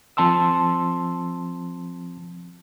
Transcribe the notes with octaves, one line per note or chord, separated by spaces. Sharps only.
F3 C4 A5 C6 E6